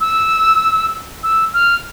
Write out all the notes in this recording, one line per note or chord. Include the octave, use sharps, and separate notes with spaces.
E6
E6
F6